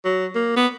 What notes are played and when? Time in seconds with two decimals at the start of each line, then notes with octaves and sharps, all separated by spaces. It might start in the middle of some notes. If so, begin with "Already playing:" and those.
0.05 F#3
0.35 A#3
0.56 B3